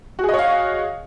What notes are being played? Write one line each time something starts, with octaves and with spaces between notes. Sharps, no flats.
F#4 G#4 C#5 D#5 F5